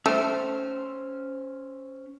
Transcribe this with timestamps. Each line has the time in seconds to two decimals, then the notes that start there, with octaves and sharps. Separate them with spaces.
0.06 A3 C#4 C5